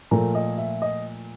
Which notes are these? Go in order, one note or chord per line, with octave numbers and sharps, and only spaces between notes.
A#2 F3 A3 A#4
D#5
E5
D#5